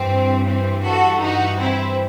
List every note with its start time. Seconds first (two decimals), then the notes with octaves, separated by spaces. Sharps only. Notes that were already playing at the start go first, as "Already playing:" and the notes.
Already playing: G2 E3 C4
0.47 C4
0.84 F#4 A4
1.21 D#4 F#4
1.59 C4 E4